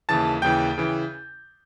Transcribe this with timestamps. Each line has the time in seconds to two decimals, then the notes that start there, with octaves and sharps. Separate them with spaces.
0.09 D#2 C#3 E3 A5 A6
0.42 D#2 C#3 E3 G5 G6
0.78 C#3 E3